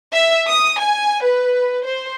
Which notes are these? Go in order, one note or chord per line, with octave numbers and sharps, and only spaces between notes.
E5
D#6
G#5
B4
C5